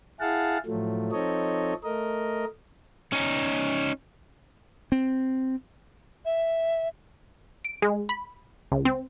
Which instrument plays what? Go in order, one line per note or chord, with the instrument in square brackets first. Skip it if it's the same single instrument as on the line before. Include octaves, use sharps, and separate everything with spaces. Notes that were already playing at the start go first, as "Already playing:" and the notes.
[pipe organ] E4 G#4 F5 F#5 A5
A2 F3 F#3 A3
F3 C4 D#4 A4 C#5 D#5
A3 A#4 D#5
[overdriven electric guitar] C#4 D#4
[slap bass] C4
[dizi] E5
[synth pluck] D7
G#3
B5
C#2
C4